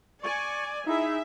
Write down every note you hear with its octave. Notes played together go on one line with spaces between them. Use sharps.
D5 G#5 C#6
D#4 E4 G#4 E5